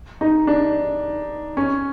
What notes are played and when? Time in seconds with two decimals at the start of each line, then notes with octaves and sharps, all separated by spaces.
0.21 D#4
0.47 D4
1.57 C#4